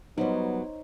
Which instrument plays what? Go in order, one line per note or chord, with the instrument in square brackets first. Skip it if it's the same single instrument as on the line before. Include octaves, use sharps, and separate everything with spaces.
[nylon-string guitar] F#3 G3 [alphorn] B3 [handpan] D#4 C5 C#5